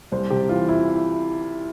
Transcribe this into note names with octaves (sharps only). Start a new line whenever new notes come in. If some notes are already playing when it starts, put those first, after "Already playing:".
C2 C5
C3 G4
E3 F4
E4